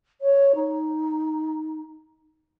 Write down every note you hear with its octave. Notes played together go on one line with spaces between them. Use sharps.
C#5
D#4